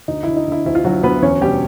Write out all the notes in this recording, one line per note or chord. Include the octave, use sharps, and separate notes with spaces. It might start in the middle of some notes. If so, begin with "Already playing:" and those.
D2 D#4
D3 E4
D#4
D3 E4
D2 E4
F4
D2 F#3 F#4
D2 B3 B4
E2 C#4 C#5
B2 G3 G4